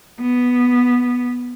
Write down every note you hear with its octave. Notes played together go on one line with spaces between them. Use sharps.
B3